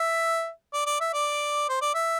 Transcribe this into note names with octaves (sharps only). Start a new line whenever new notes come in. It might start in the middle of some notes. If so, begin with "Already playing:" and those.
Already playing: E5
D5
D5
E5
D5
C5
D5
E5